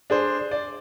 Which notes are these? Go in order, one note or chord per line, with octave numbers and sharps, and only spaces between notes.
D4 G#4 C5
D5